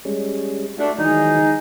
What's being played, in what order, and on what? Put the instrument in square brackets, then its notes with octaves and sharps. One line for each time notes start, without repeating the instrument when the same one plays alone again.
[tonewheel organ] G3 G#3 C#4
[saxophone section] A3 D4 [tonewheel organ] F#4
[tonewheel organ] D#3 E3 F#3 [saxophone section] G#3 D#4